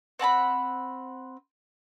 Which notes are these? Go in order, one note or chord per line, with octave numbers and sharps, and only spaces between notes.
C4 F#5 A5 B5